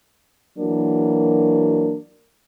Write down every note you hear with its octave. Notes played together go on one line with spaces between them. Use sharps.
E3 F#3 A#3 D4 F#4 A#4